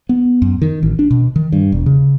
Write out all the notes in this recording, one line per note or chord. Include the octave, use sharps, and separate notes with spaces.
B3
F#2
D#3
A1
D4
B2
D#3
G2
E1
C#3